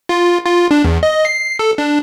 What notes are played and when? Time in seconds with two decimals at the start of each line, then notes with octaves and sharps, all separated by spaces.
0.09 F4
0.45 F4
0.71 D4
0.84 E2
1.03 D#5
1.25 C7
1.59 A4
1.78 D4